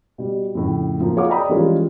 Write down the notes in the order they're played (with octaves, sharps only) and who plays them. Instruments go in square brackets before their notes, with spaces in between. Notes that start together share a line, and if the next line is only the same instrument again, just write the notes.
[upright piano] B2 G3
F2 A2 C#3
F3 F#3 A#3
G#4 C#5 F5 F#5 D6
D5 D#5 G5 A#5 B5 D#6
E3 F3 G3 G#3 C#4 F4